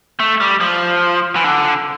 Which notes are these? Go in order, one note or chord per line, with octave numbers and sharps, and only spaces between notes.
A3
G3
F3
E3
D3